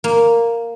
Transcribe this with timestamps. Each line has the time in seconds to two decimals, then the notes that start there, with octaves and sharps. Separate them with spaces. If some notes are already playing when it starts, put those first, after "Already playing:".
0.04 A#3